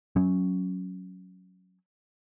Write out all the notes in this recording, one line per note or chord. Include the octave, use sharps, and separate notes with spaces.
F#3 C#4